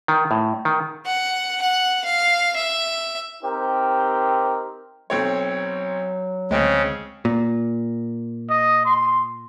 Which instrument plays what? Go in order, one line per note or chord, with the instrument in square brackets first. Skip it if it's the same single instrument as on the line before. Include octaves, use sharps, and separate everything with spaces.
[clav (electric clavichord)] D#3
A2
D#3
[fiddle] F#5
F#5
F5
E5
[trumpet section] C4 D#4 G4 A#4
[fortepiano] B1 C4 C#5 [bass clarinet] F#3
[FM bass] D2 [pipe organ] C#3 [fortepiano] G#3 C4
[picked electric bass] A#2
[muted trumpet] D#5
C6